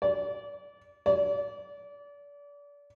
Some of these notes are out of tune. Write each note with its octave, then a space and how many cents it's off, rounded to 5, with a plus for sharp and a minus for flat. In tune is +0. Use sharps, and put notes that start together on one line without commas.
D5 -30
D5 -35